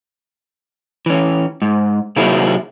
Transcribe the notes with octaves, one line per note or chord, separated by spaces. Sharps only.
E3 C#4
G#2
C3 D#3 F#3 A#3 E4 G#4